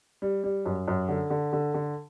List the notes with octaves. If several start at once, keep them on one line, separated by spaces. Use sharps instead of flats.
G3
G3
F#2
F#2
D3
D3
D3
D3